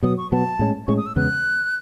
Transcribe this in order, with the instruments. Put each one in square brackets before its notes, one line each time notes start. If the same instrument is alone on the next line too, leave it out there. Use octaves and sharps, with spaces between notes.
[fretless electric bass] B2 F#3 B3 [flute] D#6
[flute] C#6
[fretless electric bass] B2 F#3 B3 [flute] A5
[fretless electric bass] A2 G#3 C#4
[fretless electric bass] A2 G#3 C#4 [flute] C#6
[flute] D#6
E6
[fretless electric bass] E2 C#3 G#3 B3 [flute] F#6